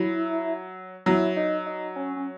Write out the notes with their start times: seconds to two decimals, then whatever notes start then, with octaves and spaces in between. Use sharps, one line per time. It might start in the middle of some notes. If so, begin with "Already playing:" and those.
Already playing: F#3 E4
1.06 F#3 E4
1.37 D#4
1.67 D#4
1.96 C#4
2.16 C#4